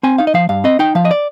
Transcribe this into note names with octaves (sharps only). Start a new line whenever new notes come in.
C4 G#5
D#4 F5
D#5
F3 F5
G2 F5
C4 D#5
D#4 G5
F3 F5
D#5
D5